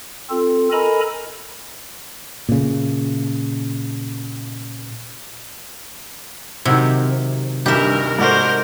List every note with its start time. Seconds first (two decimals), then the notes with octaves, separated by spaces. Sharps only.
0.30 C4 F4 A4
0.72 A4 A#4 D#5 G#5 A#5 B5
2.49 A#2 C#3
6.65 C3 D#3 F#3 E4
7.66 D2 G2 D#4 G4 A#4 E5
8.19 G#2 A3 F#4 A#4 C5 D5